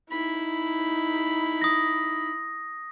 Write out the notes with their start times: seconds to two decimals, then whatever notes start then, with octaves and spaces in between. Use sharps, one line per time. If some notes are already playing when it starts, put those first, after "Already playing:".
0.10 D#4 E4 B5
1.62 D#6 A#6